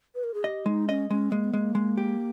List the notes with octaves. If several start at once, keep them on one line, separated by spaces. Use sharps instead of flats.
B4
A#4
G#4
G4 D#5
G#3 D#4
C#4 D#5
G#3 C#4
G#3 A#3
B3
G#3 A#3
G#3
G4